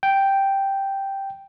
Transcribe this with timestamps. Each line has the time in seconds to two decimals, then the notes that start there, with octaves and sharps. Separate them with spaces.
0.03 G5